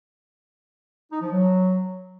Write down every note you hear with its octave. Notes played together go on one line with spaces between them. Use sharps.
D#4
F3
F#3